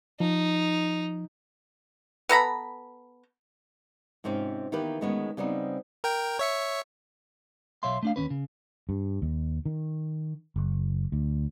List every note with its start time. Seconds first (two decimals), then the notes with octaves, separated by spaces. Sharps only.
0.20 F3 D#4
2.29 B3 A4 A#5 B5
4.24 G#2 C3 C4 C#4 F4
4.72 D#3 E3 A#3 B3 G4 B4
5.01 D2 D#3 G#3 B3 C#4 C#5
5.37 C#3 G3 B3 C4 D#4
6.04 A#4 G5
6.39 C#5 E5 C#7
7.83 B1 C#5 E5 F5 C6
8.03 A3 D4 F5
8.16 D#2 C3 C#4 B4
8.30 C#3
8.89 G2
9.22 D#2
9.66 D#3
10.56 F#1
11.12 D2